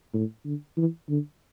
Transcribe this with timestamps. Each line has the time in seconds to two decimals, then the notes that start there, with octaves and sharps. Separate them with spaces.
0.14 A2
0.45 D3
0.77 E3
1.09 D3